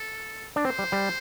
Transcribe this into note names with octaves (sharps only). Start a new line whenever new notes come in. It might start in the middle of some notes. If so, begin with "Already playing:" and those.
Already playing: A4
D4
C4 C5
G3
G3